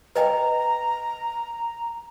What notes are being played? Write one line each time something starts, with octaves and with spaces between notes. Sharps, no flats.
B4 D#5 G5 A#5